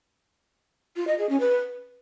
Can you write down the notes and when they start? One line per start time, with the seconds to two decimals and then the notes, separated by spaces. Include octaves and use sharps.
0.96 F4
1.07 D#5
1.18 G#4
1.29 C#4
1.40 B4